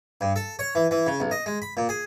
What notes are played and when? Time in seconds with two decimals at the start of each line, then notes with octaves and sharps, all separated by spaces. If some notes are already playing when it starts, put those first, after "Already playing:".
0.21 G2
0.36 A4
0.59 C#5
0.75 E3
0.91 E3
1.07 C#3
1.20 B1
1.31 D#5
1.46 G#3
1.62 B5
1.77 A#2
1.89 G#4